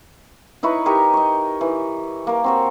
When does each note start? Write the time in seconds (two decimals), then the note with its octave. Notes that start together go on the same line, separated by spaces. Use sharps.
0.63 D#4 E4 B4 C#5
0.86 D#4 G4 A#4 C#5
1.14 C#5 D#5
1.61 E3
2.27 A#3 A#4
2.44 C4 F#4 C#5